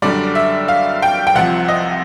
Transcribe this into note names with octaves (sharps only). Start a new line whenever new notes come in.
F#2 D3 G3 D5
E5
F5
G5
G5
C2 C3 F3 F#5
D#5